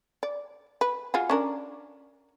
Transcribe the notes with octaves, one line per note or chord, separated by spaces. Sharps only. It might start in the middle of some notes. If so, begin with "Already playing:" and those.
D5
B4
F4 F#4 G#4
C#4 D4 A#4